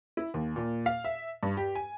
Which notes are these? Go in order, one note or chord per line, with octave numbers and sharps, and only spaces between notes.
E4
D#2
A#2
F5
E5
G2
G4
G#5